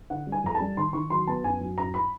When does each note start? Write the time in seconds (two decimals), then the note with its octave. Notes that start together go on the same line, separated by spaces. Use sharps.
0.10 D3 F#5
0.27 G3
0.32 G#5
0.44 F2 A#5
0.55 A5
0.60 G3
0.77 D#3 C6
0.93 D#3 C#6
1.10 F#3 C6
1.27 B3 A5
1.44 F#2 G#5
1.61 F#3
1.77 F#2 A#5
1.94 B5